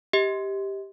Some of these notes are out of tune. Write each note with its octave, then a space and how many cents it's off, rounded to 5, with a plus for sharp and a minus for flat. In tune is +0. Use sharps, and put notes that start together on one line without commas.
G4 +0 D#5 +35